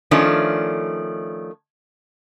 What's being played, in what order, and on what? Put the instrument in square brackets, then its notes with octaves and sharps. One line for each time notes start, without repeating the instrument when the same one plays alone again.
[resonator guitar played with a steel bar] D#3 F3 A3 C#4 D4